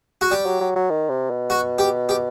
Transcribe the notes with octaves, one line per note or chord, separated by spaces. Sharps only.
F#4
G3 G4
F#3
F#3
F#3
D#3
C3
B2
F#4
G4
G4